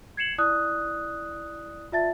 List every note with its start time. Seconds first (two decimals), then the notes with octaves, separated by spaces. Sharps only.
0.17 G#6 C7 C#7 E7 F#7
0.38 E4 D5 D#6 F#6
1.92 F4 D5 E5 A5 A6